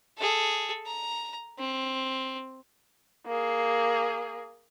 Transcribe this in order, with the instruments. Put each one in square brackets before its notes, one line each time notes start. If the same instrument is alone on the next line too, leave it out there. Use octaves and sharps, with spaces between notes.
[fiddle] G#4 A4
A#5
C4
[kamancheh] A#3 G#4